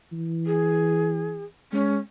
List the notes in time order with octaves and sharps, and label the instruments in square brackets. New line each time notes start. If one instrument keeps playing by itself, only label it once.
[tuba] E3
[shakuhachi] G#4
[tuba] G#3 [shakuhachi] C#4